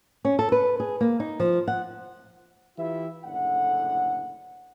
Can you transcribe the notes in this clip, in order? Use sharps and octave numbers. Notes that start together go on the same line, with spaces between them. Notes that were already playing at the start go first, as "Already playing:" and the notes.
C#4
A4
B4
G#4
A#3
D#4
F3
F#5
E3 E4 F4 G4 E5
F#1 A2 D3 F#5